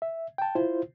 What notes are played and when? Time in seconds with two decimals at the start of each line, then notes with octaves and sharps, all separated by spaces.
0.02 E5
0.38 G5 A5
0.55 E4 F4 C5